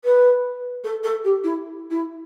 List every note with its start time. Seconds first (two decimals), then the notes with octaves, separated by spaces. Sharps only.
0.04 B4
0.84 A4
1.03 A4
1.24 G4
1.43 E4
1.90 E4